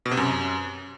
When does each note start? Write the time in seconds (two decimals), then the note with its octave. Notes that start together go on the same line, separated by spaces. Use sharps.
0.06 B2
0.11 C3
0.17 F#2